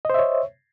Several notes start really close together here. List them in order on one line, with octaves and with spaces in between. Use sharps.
D#5 C5 E5 C#5